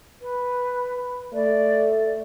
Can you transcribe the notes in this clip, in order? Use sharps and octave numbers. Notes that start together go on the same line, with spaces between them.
B4
A3 D5